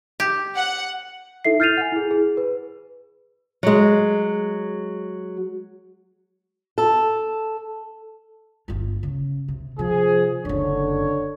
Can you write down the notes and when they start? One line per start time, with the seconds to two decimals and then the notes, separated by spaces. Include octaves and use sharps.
0.20 G4
0.56 F#5
1.45 D#4 E4 A4 E5 C7
1.60 F6 G6 A6 C7 D#7 F7
1.78 F#5 G#5
1.92 E4 G#4
2.11 G#4
2.37 B4
3.63 F#3 G#3
6.78 A4
8.68 G1 F4
9.03 C#3
9.48 C3
9.79 C3 F3 G#4
10.45 F#1 F#2 D3 C#5